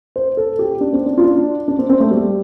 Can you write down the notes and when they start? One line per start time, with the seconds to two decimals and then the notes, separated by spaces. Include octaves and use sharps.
0.16 C5
0.37 A4
0.59 G4
0.81 D4
0.93 C4
1.06 D4
1.18 F4
1.24 D4
1.68 D4
1.79 C4
1.90 C4
2.00 A3
2.11 G3